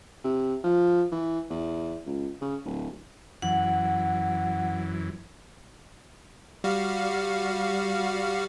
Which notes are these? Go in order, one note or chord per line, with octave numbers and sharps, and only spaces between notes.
C3
F3
E3
E2
C#2
C#3
D1
F#2 E3 F#5
G3 F#4 F5